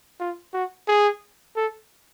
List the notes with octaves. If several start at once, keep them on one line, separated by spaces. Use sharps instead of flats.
F4
F#4
G#4
A4